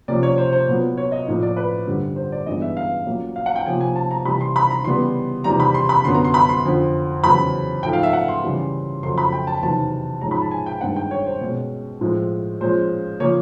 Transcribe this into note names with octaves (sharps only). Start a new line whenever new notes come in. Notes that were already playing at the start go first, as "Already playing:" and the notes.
C3 F3 A#3 C#4 D5
C#5
C5
C5
A#2 F#3 B3
C#5
D#5
A2 F3 A#3
D5
B4
G2 D3 G3 C4
C5
D5
G2 E3 G#3 B3 D#5
E5
F5
A#2 F#3 A#3 C#4
F5
F#5
G5
C3 F3 A#3 C#4 G#5
G#5
A5
A#5
C3 E3 G3 B5
C6
B5
A#5
C#3 E3 G3 B3 C6
E2 C3 D#3 G3 A#5
B5
C6
B5
F#2 D3 F#3 B3 C6
A#5
C6
B5
C6
F2 D3 F3
E2 C#3 F#3 B5
G#2 F3 A3 G5
F5
E5
F#5
C6
C#3 E3 G3
F2 C#3 F#3 A3 C6
B5
G5
A5
E2 C3 D#3 F#3 A5
G#2 F3 G#3 C#4 A#5
B5
A5
G#5
G5
G2 D#3 G#3 C4 F#5
G5
C#5
C5
B2 G#3 C#4
A2 F3 G#3 C4
A#2 F3 G#3 C#4 C5
C#3 F3 A#3 C#4 C#5